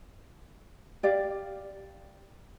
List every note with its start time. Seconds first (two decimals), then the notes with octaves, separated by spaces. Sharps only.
1.03 G4 D5 F5